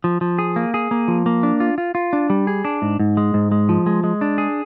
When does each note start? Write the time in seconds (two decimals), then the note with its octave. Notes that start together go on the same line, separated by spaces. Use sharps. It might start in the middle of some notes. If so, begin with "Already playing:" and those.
0.04 F3
0.21 F3
0.38 G#4
0.56 A#3
0.74 G#4
0.91 A#3
1.08 F3
1.26 A#3
1.43 D4
1.60 F4
1.78 F4
1.95 F4
2.13 D4
2.30 G3
2.47 G#4
2.65 D4
2.82 G#2
2.99 G#2
3.17 G#3
3.34 G#2
3.52 G#3
3.69 F3
3.86 G#3
4.04 G#3
4.21 D4
4.38 G#4